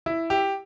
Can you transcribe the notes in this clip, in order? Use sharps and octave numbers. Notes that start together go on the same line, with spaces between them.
E4
G4